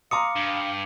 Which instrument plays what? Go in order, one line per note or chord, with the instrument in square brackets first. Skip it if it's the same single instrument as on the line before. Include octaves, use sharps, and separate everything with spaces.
[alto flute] F5 [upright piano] A#5 C6 D#6 [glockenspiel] D6 C#7
[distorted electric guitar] G2